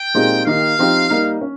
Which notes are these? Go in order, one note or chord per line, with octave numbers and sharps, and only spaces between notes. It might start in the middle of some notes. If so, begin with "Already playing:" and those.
Already playing: G5
A#2 G#3 C4 D#4 G4
D#3 A#3 D#4 G4 F5
F3 C4 D#4 G4
G3 A#3 D#4
C#4